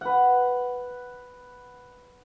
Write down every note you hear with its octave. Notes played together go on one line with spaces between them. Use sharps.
B4 F#5